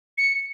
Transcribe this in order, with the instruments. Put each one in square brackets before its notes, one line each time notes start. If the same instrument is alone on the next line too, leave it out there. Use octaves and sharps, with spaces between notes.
[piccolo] C#7